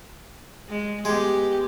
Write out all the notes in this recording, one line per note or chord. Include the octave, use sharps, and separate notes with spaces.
G#3
G#3 B3 G4